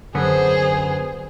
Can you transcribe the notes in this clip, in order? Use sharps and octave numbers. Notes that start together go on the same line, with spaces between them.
F#2 D3 B3 G#4 C5